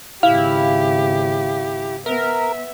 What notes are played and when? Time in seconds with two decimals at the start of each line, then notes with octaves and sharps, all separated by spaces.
0.23 G#1 C#3 E4 G4 F5
2.06 B3 A#4 E5